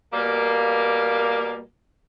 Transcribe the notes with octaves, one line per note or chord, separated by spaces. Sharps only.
B2 G3 A#3